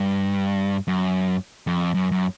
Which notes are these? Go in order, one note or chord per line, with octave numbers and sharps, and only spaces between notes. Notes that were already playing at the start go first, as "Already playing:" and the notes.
Already playing: G2
F#2
F2
F#2
F#2